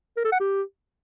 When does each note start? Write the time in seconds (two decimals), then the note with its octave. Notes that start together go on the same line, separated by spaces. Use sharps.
0.17 A#4
0.24 A4
0.32 F#5
0.40 G4